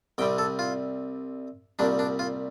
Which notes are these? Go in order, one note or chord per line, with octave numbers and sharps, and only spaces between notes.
C2 C3 G3 G5
A4
F4
C2 A#2 G3 D4
D4
F4